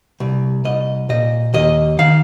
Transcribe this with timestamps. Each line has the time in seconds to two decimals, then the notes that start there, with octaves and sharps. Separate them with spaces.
0.20 C2
0.65 C2 D#5
1.09 A#2 D#5
1.54 D#2 D#5
1.99 D#3 F5